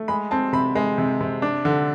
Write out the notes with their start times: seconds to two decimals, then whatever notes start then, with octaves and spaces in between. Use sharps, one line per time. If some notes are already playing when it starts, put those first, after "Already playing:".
Already playing: A3
0.08 G#3 B5
0.31 C4 A5
0.53 C3 B5
0.75 G#3
0.98 C3
1.21 C3
1.42 D4
1.65 D3